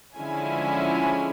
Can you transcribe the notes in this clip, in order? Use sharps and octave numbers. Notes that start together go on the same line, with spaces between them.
D3 F3 G#3 C#4 E4 G#5